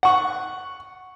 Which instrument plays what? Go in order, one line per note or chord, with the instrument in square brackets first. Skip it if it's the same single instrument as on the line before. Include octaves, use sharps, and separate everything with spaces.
[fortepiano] F#5 C#6